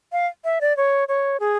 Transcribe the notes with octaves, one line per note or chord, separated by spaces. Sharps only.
F5
E5
D5
C#5
C#5
G#4